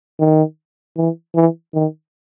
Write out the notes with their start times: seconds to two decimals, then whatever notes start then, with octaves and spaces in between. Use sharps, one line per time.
0.19 D#3
0.97 E3
1.35 E3
1.74 D#3